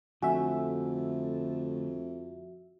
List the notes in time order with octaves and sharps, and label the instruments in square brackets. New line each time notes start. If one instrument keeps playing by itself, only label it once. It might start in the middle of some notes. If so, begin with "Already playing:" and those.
[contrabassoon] F2 [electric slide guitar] D3 A3 [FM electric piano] F#4 E5 [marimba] G#5